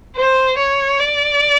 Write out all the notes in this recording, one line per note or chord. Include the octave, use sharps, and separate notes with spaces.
C5
C#5
D5